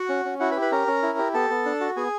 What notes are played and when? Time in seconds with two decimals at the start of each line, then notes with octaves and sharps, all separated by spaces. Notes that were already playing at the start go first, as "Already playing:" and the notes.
Already playing: F#4 F#5
0.09 C#4
0.25 C#4
0.40 E4 F#4 F#5
0.51 B4 B5
0.56 G4
0.62 B4 B5
0.72 C#4 A#4 A#5
0.88 C#4
1.03 E4
1.18 G4
1.34 B3 A4 A5
1.50 B3
1.66 D4
1.81 F#4
1.96 B3 G#4 G#5